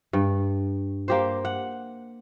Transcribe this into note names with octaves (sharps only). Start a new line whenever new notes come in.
G2
A#3 G4 C5
F#5